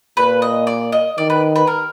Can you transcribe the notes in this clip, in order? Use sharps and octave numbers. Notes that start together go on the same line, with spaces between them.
A#2 B4
D#5
D5
D#5
D#3 D5
B4
B4
A#4